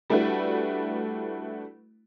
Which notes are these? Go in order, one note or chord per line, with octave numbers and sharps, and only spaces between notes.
G3 A3 D4 E4 F#4 B4